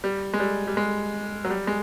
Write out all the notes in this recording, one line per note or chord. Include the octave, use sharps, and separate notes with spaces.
G3
G#3
G3
G3
G#3
F#3
G3
G#3